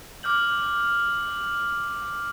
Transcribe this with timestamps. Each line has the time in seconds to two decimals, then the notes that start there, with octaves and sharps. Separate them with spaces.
0.23 D6 F6 G6 F#7